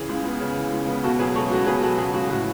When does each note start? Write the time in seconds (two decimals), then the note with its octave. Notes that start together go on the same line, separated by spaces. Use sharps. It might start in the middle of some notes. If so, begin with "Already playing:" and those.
Already playing: C#3 E3 G#4
0.09 C#2
0.25 B3
0.40 C#3
0.56 E3
0.72 C#2
0.88 B3
1.03 B2 F#4 A4
1.19 F#3 G#4 B4
1.35 C#2 A4 C#5
1.51 C#2 F#4 A4
1.66 B2 G#4 B4
1.82 F#3 F#4 A4
1.98 C#2 G#4
2.14 C#2 F#4
2.30 A2 F#4